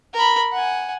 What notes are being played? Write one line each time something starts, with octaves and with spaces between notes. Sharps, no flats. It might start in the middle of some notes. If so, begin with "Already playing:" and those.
A#4 B5
F#5 G#5